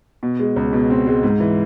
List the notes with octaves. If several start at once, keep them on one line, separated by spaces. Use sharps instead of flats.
B2
G#3
C#2
B2
C4
G#3
G#2
E3